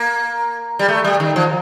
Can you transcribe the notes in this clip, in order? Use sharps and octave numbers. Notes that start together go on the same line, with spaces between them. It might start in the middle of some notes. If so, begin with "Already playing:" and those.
Already playing: A#3
G3
A3
G3
D#3
F3